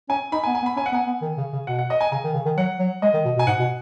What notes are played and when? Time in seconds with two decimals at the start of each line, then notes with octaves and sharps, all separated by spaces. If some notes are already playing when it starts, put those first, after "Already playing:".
0.09 C#4 G#5
0.32 D#4 B5
0.44 G#5
0.47 B3
0.55 G#5
0.62 B3
0.66 B5
0.77 C#4 G#5
0.86 F#5
0.92 B3 G#5
1.07 B3
1.22 D#3
1.38 C#3
1.53 C#3
1.67 B2 F#5
1.79 F#5
1.90 D#5
2.01 G#5
2.12 C#3 G#5
2.24 D#3
2.34 C#3
2.46 D#3
2.57 F#3 F#5
2.79 F#3
3.02 G#3 D#5
3.14 D#3
3.25 B2
3.37 B2
3.39 G#5
3.47 G#2 F#5
3.59 B2